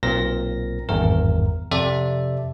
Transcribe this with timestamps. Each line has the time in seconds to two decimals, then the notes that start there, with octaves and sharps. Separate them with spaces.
0.03 B1 A#2 C4 A#4 A#6
0.89 G#1 E2 G2 A#4
1.71 F2 C3 A4 D5 E5